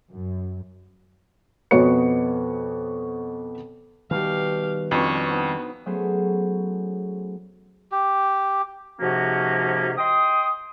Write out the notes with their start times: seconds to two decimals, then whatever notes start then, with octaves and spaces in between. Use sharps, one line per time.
0.10 F#2
1.71 F2 B2 B3 F#4 C#5 C#7
4.11 B2 D#3 G3 G4 F5
4.91 F2 B2 C#4 D4 C#6
5.30 B3 D#4 C5 F#5
5.86 F#3 A3 B3 C#4 G#4 C5
7.92 G4
9.00 G#2 C3 F3 A#3 C#4 F#4
9.98 D#5 G5 C6 D#6